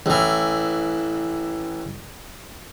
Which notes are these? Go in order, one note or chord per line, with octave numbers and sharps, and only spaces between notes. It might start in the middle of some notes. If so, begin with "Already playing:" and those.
A1 E3